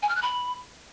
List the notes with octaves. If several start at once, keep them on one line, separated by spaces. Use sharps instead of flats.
G#5
F6
F#6
B5